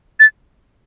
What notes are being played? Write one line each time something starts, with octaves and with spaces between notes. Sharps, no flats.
A6